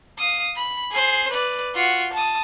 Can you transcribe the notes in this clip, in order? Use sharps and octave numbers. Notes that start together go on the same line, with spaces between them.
F5 D#6
B5
G#4 C5
B4 D5
F4 F#4
A5 D#6